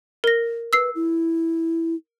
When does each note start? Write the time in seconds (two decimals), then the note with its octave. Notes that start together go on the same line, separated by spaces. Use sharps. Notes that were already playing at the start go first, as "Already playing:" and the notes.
0.24 A#4 A#6
0.73 B4 E6 C7
0.95 E4